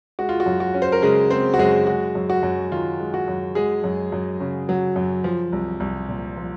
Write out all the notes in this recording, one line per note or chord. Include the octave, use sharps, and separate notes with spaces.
G#3 F#4
F4
F#4
F#2
F#4
C#4
C5
A#4
C#3 G#3 G#4
G#3 C4 C5
F#4
F#2 G#3 G#4
G#3 F#4
F#2
F#4
F#2
D#3 F4
G#3
F#4
F#2
F#3 G#3 G#4
F#2
F#2
C#3
F#3
F#2
F3
C2
C2
A#2
F3